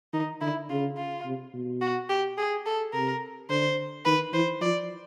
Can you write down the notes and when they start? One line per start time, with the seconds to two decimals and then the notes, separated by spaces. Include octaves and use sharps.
0.13 D#3 D#4
0.42 D3 E4
0.70 C#3 F4
0.97 F4
1.25 C3
1.54 B2
1.82 F#4
2.10 G4
2.38 G#4
2.66 A4
2.94 C3 A#4
3.50 D3 C5
4.05 D#3 B4
4.33 E3 C5
4.61 F3 D5